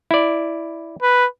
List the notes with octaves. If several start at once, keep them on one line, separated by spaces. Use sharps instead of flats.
E4 D5
B4